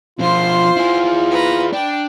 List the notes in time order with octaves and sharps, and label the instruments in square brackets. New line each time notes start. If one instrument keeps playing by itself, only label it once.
[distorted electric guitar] B2 F3 [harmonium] F4 [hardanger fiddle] C5 C6
[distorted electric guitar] E4 G#4
[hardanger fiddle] B4 A#5
[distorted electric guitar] D4 [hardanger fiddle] G5